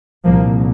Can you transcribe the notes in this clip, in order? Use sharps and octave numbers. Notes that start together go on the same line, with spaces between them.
C2 A#2 F3 A#3